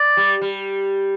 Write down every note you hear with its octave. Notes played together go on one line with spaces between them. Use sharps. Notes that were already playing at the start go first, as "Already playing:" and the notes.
Already playing: D5
G3
G3